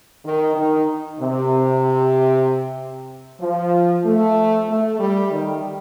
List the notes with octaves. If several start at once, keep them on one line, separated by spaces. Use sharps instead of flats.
D#3
D#3
C3
F3
A3
A3
G3
D#3